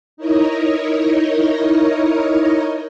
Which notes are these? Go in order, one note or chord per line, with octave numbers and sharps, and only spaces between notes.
D#4 E4 A#4 C#5 D#5